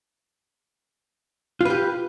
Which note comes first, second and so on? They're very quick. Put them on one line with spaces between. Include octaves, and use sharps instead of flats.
F4 B4 G4